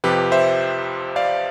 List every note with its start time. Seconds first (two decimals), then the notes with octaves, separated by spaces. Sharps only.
0.04 F2 C3 F3 G4 B4
0.32 C5 E5
1.16 D5 F5